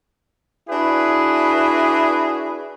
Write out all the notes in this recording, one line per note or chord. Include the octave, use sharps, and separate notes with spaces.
D4 E4 F#4 G#4 B4